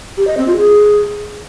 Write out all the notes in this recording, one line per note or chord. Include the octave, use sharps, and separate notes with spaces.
G4
D#5
C4
F4
G#4